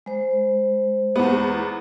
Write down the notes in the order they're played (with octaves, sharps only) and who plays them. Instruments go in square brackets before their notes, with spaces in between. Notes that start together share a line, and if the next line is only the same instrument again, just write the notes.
[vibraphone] G#3 C5
[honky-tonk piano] E2 B3